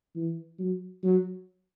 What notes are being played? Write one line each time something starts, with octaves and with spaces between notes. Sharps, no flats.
E3
F#3
F#3